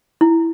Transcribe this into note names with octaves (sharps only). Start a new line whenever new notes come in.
E4